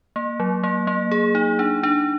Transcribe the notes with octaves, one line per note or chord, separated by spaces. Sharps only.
A#3
F#3
A#3
A#3
G#4
D#4
D4
D4